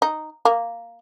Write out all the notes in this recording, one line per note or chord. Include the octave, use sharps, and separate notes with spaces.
D#4
A#3